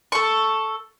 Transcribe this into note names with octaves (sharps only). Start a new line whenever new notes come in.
A4 C#6